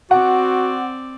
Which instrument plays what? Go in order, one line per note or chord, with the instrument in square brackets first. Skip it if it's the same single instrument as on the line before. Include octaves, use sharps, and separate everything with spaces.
[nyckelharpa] C4 D5 [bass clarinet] F#4 [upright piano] F#5